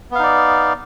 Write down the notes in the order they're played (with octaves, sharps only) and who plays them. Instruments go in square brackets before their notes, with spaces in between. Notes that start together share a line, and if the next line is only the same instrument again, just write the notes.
[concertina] B3
F5
D#4
D5